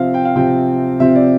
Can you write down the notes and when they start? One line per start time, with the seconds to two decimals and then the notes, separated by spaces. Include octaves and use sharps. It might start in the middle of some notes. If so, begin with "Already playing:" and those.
Already playing: C3 F3 C4 E5 F5
0.14 G5
0.25 F5
0.36 C3 F3 C4 G5
1.00 C3 F3 C4 E5
1.15 D5